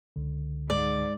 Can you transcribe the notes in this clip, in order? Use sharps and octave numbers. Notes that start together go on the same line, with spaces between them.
C#2 D3
G#2 D5